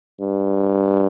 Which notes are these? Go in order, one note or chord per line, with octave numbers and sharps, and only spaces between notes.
G2